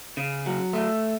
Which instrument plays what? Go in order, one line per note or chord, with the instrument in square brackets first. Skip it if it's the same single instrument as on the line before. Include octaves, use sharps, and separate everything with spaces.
[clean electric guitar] C#3
F#3
A3